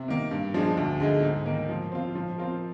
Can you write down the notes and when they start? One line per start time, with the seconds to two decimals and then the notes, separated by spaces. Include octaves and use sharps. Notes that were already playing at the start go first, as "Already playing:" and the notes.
Already playing: C3
0.08 D#3 A#3
0.31 G2
0.54 F3 G#3 D4 G#4
0.77 D2
1.00 D3 G#3 D#4 G#4
1.23 G#2
1.46 D#3 A#3
1.69 F3
1.92 C4 F4
2.15 F3
2.38 C4 F4 A#4